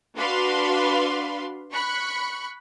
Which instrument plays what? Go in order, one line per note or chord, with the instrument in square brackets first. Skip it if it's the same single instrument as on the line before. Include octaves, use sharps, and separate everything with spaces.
[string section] D4 F#4 B4 F5 B5 C6
B5 C#6 F#6